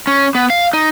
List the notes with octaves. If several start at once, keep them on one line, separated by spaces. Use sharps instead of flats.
C#4
B3
F5
D#4